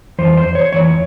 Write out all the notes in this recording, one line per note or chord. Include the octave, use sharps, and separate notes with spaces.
F2 E3 C5
C5
C#5
F2 E3 C#5